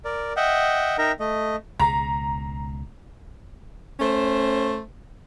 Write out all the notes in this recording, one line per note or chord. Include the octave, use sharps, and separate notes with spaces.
A#4 D5
D#5 E5 F#5 G5
D#4 A#4 E5 G5 A#5
A3 D#5
C#2 B2 A#5
A3 C#4 C5